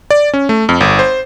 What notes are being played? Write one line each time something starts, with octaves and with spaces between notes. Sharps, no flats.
D5
C#4
A3
F2
G1
C5